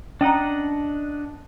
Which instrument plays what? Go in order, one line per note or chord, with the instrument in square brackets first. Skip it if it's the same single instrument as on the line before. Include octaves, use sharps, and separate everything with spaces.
[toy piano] C#4 A#5 [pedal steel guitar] D4 D#5 F#5